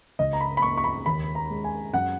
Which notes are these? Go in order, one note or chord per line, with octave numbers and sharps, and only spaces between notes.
C#2 D#5
A#5
B5
B5
A#3 C#6
C#6
B5
D#2 B5
A#5
G#3
G#5
F#2 F#5